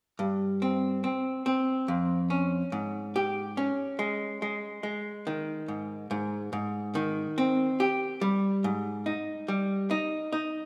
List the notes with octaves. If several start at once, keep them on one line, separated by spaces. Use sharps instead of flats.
G2
C4
C4
C4
F2
C#4
G#2
G4
C#4
G#3
G#3
G#3
D#3
G#2
G#2
G#2
D#3
C4
G4
G3
G#2
D#4
G3
D#4
D#4